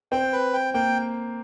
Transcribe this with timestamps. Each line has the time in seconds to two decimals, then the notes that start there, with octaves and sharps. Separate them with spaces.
0.12 C4 G5
0.33 B4
0.54 G5
0.74 A#3 G5